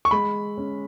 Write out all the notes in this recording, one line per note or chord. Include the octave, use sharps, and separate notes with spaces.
C#6
G#3 B5
C#4